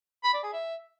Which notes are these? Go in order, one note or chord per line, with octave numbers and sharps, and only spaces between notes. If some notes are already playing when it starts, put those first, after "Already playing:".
B5
D5
G#4
E5